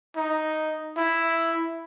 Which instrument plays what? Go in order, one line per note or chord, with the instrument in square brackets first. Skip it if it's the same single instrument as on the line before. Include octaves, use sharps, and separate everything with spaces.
[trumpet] D#4
E4